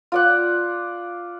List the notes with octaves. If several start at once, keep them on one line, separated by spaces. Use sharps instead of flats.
F4 D5 F#5